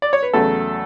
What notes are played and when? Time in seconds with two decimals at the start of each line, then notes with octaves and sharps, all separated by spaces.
0.02 D5
0.13 C#5
0.23 B4
0.33 E2 C#3 F#3 A3 A4